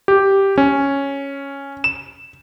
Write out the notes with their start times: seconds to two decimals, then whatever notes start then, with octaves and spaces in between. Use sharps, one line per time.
0.08 G4
0.58 C#4
1.84 E7